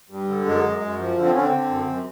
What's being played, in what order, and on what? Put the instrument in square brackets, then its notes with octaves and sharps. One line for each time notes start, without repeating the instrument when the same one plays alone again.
[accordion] G2
D3
F#2 G#3
F#2
F#2
F3
D3
C4
D3 C#4
C4
D3
F#2
F#2